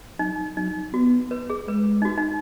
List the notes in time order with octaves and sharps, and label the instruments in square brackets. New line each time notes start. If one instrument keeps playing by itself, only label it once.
[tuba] F#3 [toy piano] D#4
[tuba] F#3 [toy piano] D#4
[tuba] B3 [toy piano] F#4
[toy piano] B4
G#4
[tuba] G#3 [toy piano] B4
[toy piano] D#4
F#4
D#4